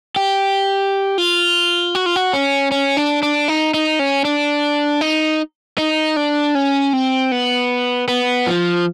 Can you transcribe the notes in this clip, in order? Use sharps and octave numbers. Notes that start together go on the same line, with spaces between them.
G4
F4
F#4
F4
F#4
C#4
C#4
D4
D4
D#4
D#4
C#4
D4
D#4
D#4
D4
C#4
C4
B3
B3
F3